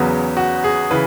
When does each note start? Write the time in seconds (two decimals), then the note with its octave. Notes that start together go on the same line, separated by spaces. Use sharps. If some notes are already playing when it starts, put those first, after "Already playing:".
Already playing: E2 C#3 F#3 B3
0.37 F#4
0.64 G#4
0.91 C#3 E3 B4